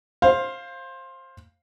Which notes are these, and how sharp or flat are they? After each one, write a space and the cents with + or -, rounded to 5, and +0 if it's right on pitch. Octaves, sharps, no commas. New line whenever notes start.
C5 +20 F5 +0